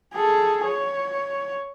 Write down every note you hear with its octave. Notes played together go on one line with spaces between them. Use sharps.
G#4 A4
C#5